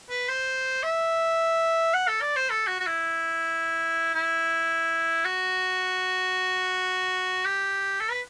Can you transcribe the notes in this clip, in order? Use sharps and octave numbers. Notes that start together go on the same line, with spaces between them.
B4
C5
E5
F#5
A4
D5
C5
A4
F#4
F#4
E4
E4
F#4
G4
A4
B4